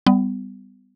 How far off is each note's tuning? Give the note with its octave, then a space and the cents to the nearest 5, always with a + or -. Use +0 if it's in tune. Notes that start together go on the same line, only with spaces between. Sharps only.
G3 +0 B3 +30